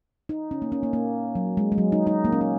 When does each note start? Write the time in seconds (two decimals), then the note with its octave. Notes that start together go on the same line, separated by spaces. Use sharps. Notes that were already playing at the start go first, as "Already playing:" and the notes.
0.29 D#4
0.51 C#4
0.62 A#3
0.72 C#4
0.83 A#3
0.93 A#3
1.35 F#3
1.57 G#3
1.72 G#3
1.78 F#3
1.92 D#4
2.07 D#4
2.25 A#3
2.32 C#4
2.41 D#4